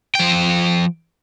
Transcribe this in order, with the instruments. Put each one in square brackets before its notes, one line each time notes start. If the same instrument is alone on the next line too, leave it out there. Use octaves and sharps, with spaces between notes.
[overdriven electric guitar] F3 G5